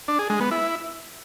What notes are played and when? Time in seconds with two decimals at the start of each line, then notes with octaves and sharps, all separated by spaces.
0.08 D4
0.19 G#4
0.30 G#3
0.41 B3
0.51 E4